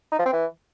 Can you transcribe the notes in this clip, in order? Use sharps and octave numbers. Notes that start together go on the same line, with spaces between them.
D#4
F3
C4
E3